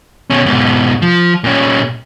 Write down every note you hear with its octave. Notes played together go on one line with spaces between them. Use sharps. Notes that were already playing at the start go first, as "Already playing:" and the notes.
B2 C#4
G#2 B2
F3
A#2 C#4